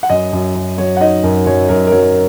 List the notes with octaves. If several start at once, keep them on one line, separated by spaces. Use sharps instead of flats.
F#5
F#2 D#5
F#2
F#2
F#3 C#5
F#5
D#4 D#5
F#2 A#4
F#2 C#5
F#2 A#4
A#4
F#3 C#5